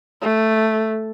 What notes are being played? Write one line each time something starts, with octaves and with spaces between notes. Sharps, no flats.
A3